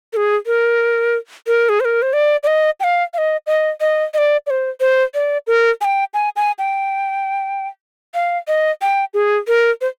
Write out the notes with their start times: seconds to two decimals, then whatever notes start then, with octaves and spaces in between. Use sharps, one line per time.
0.13 A#4
0.17 G#4
0.46 A#4
1.47 A#4
1.69 G#4
1.80 C5
1.85 A#4
2.02 C5
2.13 D5
2.43 D5
2.47 D#5
2.80 G5
2.84 F5
3.14 F5
3.18 D#5
3.47 D#5
3.81 D#5
4.14 D#5
4.18 D5
4.47 D5
4.50 C5
4.80 C5
5.14 D5
5.47 A#4
5.81 G#5
5.85 G5
6.14 G#5
6.36 G#5
6.59 G5
8.14 F5
8.48 D#5
8.82 G5
9.14 G#4
9.47 A#4
9.81 C5